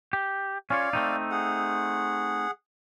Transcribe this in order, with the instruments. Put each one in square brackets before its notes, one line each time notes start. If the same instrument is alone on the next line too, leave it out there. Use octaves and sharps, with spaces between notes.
[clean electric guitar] G4
[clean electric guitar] C#4 F4 C#5 [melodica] D5 F5
[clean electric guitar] A3 C4 D#4
[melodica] G#4 F#5